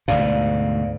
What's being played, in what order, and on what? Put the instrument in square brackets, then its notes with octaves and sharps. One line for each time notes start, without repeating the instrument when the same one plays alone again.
[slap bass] D2 G#2 B2 [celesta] D5 F5